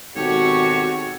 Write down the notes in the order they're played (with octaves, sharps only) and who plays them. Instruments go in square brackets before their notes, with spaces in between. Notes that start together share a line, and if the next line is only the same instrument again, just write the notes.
[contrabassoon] G#1 [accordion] B2 G4 A4 [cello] F#4 [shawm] C#5